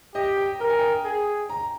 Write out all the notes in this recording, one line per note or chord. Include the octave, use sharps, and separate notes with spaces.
G4 D#5
G5
A#4 G5
G#5
G5
G#4
A#5